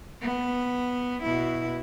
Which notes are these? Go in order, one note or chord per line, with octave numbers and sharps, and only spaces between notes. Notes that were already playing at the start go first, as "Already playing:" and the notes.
B3
B2 E4